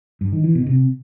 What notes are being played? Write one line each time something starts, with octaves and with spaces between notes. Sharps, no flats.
G2
D#3
E3
B2
C3